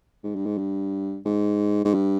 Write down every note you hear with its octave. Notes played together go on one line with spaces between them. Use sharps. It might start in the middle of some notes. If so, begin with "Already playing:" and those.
G#2
G2
G#2
G2
G#2
G#2
G2